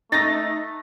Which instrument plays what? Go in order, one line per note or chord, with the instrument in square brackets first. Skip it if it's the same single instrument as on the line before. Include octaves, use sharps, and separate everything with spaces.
[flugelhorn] A3 [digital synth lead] D#4 [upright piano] A6 A#6